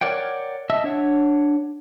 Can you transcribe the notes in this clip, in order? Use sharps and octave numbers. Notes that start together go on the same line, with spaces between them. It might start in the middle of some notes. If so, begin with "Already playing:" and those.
A#4 C#5 D5 F#5 G5
D#5 E5 A5 E6
D4 C#5 F#5